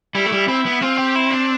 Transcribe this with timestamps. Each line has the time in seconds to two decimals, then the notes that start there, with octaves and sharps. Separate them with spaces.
0.15 G3 E4
0.26 A3
0.32 G3
0.48 C4 E4
0.66 B3
0.82 C4 F4
0.99 G4
1.16 E4
1.31 D4